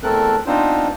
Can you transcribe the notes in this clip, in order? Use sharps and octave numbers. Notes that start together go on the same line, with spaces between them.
E2 A3 C4 A4 A#4 F#6
B3 C4 D4 D#4 F4 C5